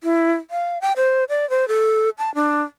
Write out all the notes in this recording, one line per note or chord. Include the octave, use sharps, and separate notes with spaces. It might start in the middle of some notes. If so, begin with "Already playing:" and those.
E4
F5
G5
C5
D5
C5
A4
A5
D4